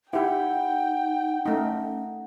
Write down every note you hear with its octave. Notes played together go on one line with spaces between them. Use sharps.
D#4 E4 G4 F#5 G5
A3 C#4 D#4